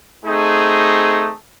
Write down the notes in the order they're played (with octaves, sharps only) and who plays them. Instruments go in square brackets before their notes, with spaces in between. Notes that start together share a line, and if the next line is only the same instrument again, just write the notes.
[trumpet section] A3 C4 D#4 G#4